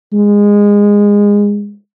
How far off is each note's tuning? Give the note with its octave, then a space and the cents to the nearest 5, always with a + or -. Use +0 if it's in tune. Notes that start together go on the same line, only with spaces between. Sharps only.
G#3 -20